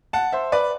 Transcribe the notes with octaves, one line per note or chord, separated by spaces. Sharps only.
F#5 A5
C5 E5
B4 D5